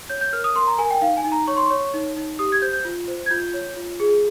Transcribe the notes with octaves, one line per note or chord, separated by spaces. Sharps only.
C#5 G6
G6
A#4 F6
D#6
A#4 C6
A#5
A#4 G#5
G5
D#4 F5
G#5
D#4
A#5
C#5 C#6
C6
C#5 C#6
D#4
D#4
G4 D#6
G#6
C5 G6
G6
F4
C5
G#6
F4 G6
C#5
F4
G#4